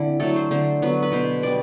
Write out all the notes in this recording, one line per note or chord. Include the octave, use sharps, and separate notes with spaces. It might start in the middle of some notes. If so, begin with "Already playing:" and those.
Already playing: D3 C4 D4 E4
F#3 A3 A4
C5
D3 C5
F#3 B3
B4
B2 C5
G3 B3 D5